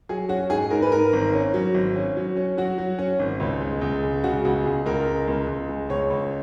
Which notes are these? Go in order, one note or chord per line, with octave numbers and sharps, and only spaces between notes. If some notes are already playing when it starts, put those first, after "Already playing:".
F#3 G#4
C#4 F#4
G#2 G#4
G#2 A#4
B4
G#2 A#4
G#1
C#4
F#3
G#1
C#4
F#3
C#4
F#3 F#4
F#3
C#4
G#1
C#2
G#3
C#2
C#3
C#3 F#4
C#2 F#4
C#2 G#4
C#2 A#4
G#3
C#2
C#2
G#3
C#2 C#5
C#2